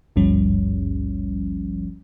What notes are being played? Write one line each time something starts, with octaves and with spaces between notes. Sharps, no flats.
G#1 D2 G2 F3 G3 C#4